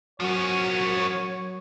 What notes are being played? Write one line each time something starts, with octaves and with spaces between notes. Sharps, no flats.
F3 F#3 C#4 F#4 A#4 C#5 C#6